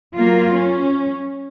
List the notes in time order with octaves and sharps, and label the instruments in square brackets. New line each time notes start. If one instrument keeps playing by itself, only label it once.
[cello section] F#3 A#3 F4
C#4